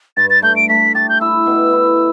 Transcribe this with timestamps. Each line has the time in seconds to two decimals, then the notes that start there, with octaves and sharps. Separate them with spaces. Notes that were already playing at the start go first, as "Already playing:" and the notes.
0.17 G2 A6
0.30 A6
0.42 A3 G6
0.56 D7
0.69 A3 B6
0.95 G4 A6
1.09 G6
1.21 E4 E6
1.46 B2
1.73 E4